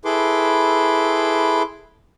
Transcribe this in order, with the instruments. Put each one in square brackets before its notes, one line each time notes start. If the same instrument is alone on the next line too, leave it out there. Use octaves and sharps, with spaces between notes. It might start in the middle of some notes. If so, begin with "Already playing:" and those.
[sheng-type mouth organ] E4 G#4 A4 B4 C6 D6